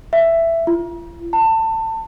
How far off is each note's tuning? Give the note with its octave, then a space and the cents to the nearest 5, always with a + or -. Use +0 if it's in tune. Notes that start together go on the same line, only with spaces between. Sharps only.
E5 +10
F4 -45
A5 +25